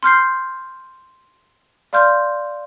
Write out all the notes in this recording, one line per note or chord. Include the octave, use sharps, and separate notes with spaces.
C6 F6 G6 C7
D5 F5 C6 F6 G6